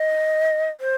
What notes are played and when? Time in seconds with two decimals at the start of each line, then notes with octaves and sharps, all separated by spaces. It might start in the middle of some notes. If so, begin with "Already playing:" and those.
Already playing: D#5
0.81 C5